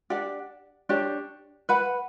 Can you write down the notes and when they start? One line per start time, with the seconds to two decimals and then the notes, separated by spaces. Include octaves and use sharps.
0.10 D4 G4 D5 F#5
0.89 D4 G4 C#5
1.69 B4 F#5 B5